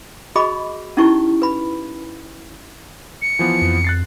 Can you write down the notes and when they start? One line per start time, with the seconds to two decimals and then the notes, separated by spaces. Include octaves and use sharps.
0.36 F#4 G#4 D#5 B5 D6
0.97 C#4 D#4 E4 G4 C#6
1.42 B4 B5
3.22 C#7
3.39 E3 F3 B3
3.62 F2
3.84 F#6 A6 C7